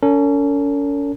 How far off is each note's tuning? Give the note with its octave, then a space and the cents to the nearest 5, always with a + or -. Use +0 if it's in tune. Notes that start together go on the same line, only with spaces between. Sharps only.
C#4 +35 A#4 -45